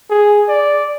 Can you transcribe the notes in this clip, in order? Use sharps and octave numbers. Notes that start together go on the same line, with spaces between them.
G#4
D5